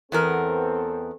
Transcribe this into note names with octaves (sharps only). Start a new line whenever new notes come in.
E2 B3 C4 A4 A#4